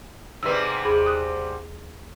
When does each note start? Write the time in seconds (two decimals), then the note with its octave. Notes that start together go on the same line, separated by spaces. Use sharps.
0.43 G#2 C3 G3 B4 E6
0.85 D#2 G#4 B5
1.06 D#6 F#6